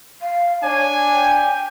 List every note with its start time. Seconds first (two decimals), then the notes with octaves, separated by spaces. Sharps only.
0.22 F5
0.63 D4 C#5 G#5
1.14 G5